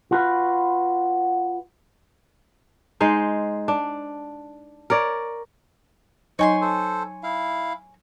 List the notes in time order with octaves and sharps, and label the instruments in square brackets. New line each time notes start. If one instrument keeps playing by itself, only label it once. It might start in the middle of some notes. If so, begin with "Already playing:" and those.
[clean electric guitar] F4 F#4 B4
[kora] G#3 D#4 C5
D4
A#4 C#5 D5
[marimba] F#3 D#4 D#5 [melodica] C5 [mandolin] C#5 G#5 C6
[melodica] A4 C5
E4 F5